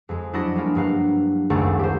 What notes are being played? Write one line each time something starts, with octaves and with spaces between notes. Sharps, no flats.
F2 G#3
F#3 D4 E4 F#4 D5 D#5
G3 G#3 A#3 D4
G2 F#3 F5 F#6
G#1 C#2 F#2 A3 C#5 D5
G4 C5